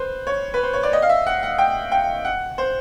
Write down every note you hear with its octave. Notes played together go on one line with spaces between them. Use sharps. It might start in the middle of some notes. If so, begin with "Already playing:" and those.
Already playing: B4 C5
C#5
B4
C5
C#5
D5
D#5
F5
E5
F#5
F#5
G5
G5
F#5
C5